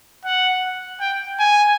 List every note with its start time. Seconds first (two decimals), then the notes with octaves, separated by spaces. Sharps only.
0.25 F#5
1.00 G5
1.39 G#5